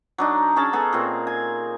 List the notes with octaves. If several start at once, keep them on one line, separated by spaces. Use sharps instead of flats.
F#3 D4 D#4
C#4 G#4 A5
B3 G#4 A4
A#2 C4
G#5